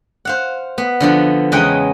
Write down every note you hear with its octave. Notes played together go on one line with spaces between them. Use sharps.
C5 F5 F#5
B3
D3 F3 B3
E2 C#3 G#3 D#5 F#5 G5